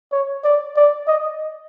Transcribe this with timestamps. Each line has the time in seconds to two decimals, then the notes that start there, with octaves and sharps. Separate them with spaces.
0.12 C#5
0.44 D5
0.76 D5
1.08 D#5